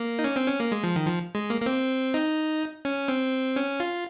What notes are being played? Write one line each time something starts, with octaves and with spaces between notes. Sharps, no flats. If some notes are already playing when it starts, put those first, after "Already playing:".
Already playing: A#3
D#4
C#4
C4
C#4
A#3
G#3
F3
D#3
F3
G#3
A#3
A#3
C4
D#4
C#4
C4
C#4
F4